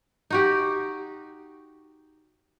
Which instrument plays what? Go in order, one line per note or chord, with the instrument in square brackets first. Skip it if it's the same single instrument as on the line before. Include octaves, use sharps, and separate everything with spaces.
[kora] D#4 F#4 G4